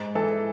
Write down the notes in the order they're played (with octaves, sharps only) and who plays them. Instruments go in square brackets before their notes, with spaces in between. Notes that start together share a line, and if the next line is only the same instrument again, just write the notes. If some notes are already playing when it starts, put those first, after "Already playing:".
Already playing: [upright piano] G#2
E3 A4